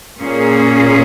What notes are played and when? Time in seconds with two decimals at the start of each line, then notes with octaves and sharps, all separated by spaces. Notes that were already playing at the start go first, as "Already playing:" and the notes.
0.20 A#2 A#3 C#4 G#4